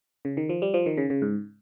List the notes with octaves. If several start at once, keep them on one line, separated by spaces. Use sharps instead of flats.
C#3
D#3
F3
G3
F3
D#3
C#3
C#3
G#2